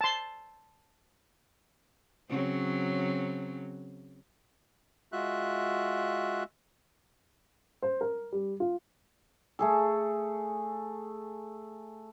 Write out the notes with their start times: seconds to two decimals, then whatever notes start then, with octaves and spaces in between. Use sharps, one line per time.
0.01 A5 C6
2.29 C#3 F#3 C4
5.12 G#3 F4 F#4 E5 F#6
7.82 C5
8.01 A#4
8.32 G3
8.60 F4
9.59 A3 G#4 A4